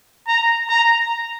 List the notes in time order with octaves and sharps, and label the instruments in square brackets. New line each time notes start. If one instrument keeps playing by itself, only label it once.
[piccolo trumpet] A#5
A#5